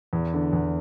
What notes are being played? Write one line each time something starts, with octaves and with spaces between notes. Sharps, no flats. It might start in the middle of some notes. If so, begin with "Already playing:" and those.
E2
D3
E2